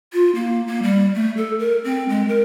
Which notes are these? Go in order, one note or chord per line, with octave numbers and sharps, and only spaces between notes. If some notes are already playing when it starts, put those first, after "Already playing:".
F4
A#3
A#3
G3
A3
A4
A#4
C4
G#3
A#4